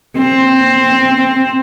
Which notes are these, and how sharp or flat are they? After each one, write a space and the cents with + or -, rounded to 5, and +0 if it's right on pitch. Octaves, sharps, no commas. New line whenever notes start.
C4 +10